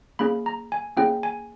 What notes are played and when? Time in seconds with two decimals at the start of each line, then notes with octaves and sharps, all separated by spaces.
0.19 A#3 C#4 E4 G#4 B5
0.46 A#5
0.72 G#5
0.97 A#3 C#4 E4 G#4 G5
1.23 G#5